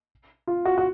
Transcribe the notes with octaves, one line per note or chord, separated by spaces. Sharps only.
F4
F#4
F#4